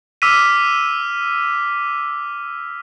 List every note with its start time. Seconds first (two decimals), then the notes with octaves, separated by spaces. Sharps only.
0.22 D6 E6 F6 B6 D#7